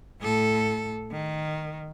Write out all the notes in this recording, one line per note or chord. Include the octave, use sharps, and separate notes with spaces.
A2 A4
D#3